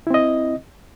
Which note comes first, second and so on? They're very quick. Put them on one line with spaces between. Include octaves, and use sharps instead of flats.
E4 C4 D#5